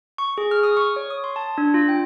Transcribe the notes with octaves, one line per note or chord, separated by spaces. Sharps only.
C#6
G#4
F6
D#6
C#6
C#5
D#6
C6
A5
D4
F4
G5